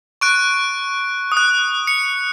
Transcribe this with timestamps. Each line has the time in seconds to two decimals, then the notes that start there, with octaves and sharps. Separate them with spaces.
0.21 C#6 F#6 D7
1.32 D#6
1.37 F#6
1.87 C#7